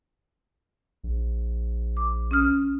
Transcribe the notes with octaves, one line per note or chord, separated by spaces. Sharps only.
A#1
D6
C#4 D#6 F6